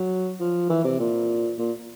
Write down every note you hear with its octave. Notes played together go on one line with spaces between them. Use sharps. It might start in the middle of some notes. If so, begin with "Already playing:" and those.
Already playing: F#3
F3
E3
C3
A#2
A#2